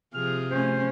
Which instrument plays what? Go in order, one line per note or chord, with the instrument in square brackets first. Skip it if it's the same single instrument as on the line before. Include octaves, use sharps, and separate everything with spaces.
[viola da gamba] C3 F3 G#4 [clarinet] F6
[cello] A3 C#4 [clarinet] C5